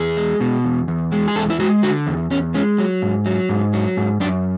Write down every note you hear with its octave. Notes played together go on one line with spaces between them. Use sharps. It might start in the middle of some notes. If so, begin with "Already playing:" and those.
Already playing: E2 G#4
G#3
B2
E2
E2
G#3
G#4
E2 A4
E4
G#3 F#4
D3 F#4
E2
E2 C#4
G#3 C#4
F#3
G#2
F#3
G#2
F#3
G#2
F#2 D4